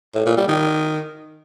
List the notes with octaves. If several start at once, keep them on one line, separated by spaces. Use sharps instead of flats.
A2
A#2
G3
D#3